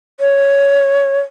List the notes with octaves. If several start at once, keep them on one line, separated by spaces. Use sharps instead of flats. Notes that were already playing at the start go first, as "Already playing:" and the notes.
C#5